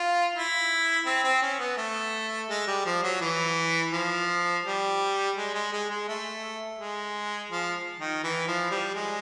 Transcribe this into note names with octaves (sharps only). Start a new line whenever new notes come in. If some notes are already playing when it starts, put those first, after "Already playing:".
Already playing: F4
E4
C4
C4
C#4
B3
A3
G#3
G3
F3
F#3
E3
F3
G3
G#3
G#3
G#3
G#3
A3
G#3
F3
D#3
E3
F3
G3
G#3